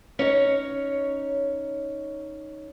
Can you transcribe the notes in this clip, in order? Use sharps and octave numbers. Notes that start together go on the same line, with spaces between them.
C#4 D#4 C#5